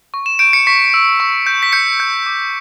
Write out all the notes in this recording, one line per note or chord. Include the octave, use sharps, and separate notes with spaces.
C#6
E7
G6 D7
C#7
C#6 B6
E6
C#6
G6
B6
G6 C#7
G6
D6